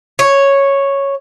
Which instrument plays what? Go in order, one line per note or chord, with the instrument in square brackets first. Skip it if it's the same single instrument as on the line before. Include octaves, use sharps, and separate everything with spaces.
[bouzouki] C#5